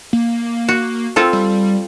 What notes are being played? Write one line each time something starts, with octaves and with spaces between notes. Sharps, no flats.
A#3
F#4
C4 F4 A4
G3